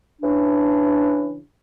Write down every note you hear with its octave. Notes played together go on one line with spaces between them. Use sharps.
C#3 E3 D4